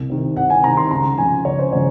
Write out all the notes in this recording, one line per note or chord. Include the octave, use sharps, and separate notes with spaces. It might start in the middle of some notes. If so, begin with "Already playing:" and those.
Already playing: C2
C3 D#3
C2 F#5
G#5
C3 D#3 A#5
C6
C#2 A#5
C#3 F3 G#5
C#2 C#5
C5
C#3 F3 C#5